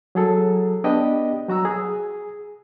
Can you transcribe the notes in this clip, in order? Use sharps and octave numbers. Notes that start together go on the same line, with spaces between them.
F#3 G#4 A4
B3 D4 G4 D#5 G5
F#3 F#4 A#5 E6
G#4